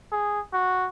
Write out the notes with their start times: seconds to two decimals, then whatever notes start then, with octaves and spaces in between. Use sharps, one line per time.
0.12 G#4
0.53 F#4